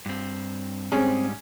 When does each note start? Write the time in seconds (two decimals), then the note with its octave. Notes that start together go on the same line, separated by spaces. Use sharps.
0.06 G2 C4
0.92 G#2 G3 C4 C#4 G#4